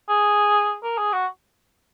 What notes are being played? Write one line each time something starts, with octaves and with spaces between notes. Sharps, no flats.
G#4
A#4
G#4
F#4